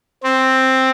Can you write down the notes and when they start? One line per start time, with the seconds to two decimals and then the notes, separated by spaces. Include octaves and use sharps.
0.23 C4